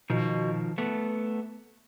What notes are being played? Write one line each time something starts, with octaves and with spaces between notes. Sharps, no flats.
B2 D#3 F3
A3 B3